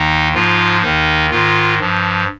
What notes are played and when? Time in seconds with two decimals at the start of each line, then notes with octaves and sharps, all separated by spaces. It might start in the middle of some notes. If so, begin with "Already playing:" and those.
Already playing: D#2 D#3 D#4
0.34 G#2 F3 F4
0.82 D#2 D#3 D#4
1.31 G#2 D#3 F4
1.79 G2 F3